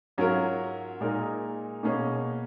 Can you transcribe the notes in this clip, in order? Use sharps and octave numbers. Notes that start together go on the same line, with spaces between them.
G#2 F#3 C#4 F4 A#4
A#2 G#3 D#4 A#4
B2 A#3 C#4 G#4